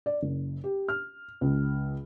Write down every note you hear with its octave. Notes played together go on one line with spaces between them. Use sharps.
D5
F#1
G4
F6
C#2